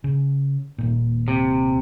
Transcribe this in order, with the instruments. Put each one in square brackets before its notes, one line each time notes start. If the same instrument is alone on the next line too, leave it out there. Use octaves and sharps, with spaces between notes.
[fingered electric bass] C#3
D#1 A#2
[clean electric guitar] C3